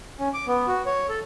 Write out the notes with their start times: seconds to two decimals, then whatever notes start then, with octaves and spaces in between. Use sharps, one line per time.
0.19 C#4
0.34 D6
0.47 B3
0.67 F#4
0.86 C#5
1.09 A4